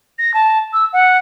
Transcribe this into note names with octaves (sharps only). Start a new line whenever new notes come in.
A#6
A5
E6
F#5